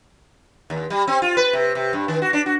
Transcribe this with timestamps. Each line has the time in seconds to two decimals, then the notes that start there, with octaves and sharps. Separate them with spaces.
0.70 D#2
0.90 G3
1.07 C4
1.22 F4
1.37 B4
1.53 C3
1.75 C3
1.93 G2
2.08 D#3
2.22 F#4
2.33 D4
2.46 F#4